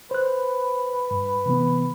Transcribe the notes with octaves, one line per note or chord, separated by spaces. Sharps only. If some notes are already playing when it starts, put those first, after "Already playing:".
B4 C5 F#6
G2
C3 E3 B3